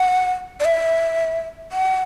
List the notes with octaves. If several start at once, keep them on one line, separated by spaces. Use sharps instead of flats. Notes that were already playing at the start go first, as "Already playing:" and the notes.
Already playing: F#5
D5
E5
F#5